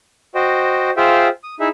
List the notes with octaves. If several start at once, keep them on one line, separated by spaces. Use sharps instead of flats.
F#4 C5 D#5 G5
F4 G#4 C5 E5 F5 G5
D#6
D#4 E4 G#4 E5